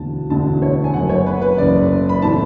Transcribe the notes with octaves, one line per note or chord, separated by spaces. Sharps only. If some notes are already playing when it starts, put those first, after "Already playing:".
Already playing: E1 D2 D3 A5
E1 D2 D3 A5
C#5
G#5
F#1 F#2 C#3 F#5
C#5
B4
B4
F#1 F#2 C#3 D5
B5
A2 E3 A5